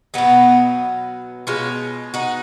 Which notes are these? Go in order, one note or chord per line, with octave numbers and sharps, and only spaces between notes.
B2 F#3 B3 D#4
B2 G#3 C#4 F4
D#4 F#4